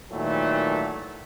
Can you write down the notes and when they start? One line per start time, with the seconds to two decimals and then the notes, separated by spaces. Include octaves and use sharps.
0.11 A#2 D#3 E3 F#3 A3